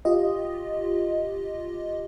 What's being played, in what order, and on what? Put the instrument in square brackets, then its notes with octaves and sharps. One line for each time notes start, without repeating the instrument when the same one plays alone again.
[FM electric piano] F4 G4 D#5